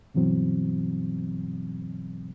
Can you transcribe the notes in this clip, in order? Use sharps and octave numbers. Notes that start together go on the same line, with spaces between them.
G2 B2 E3 F#3 C4